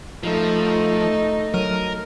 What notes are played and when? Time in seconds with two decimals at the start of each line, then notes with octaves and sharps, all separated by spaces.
0.23 F3 A3 D#4
1.54 F#3 A#4 F6 D#7